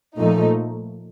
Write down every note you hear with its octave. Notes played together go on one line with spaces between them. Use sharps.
A#2 F3 A3 D#4